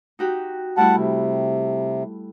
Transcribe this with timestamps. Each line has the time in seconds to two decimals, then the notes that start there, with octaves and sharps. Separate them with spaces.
0.19 D#4 F#4 G4
0.77 G3 A3 E4 F#5 A5
0.96 C3